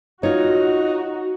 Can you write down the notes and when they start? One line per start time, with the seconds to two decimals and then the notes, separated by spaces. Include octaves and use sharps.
0.23 D#4 F4 F#4 C#5